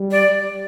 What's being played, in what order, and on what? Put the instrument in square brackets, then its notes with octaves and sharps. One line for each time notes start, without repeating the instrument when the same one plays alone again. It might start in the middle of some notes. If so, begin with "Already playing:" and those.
Already playing: [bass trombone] G3
[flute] D5